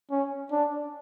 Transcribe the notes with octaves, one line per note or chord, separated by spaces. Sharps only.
C#4
D4